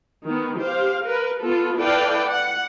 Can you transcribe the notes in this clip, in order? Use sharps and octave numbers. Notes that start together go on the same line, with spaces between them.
D#3 B3
G4 C5 F5
A#4 B4
B3 F4 A4
E4 A4 B4 D5 F5 G5
F#5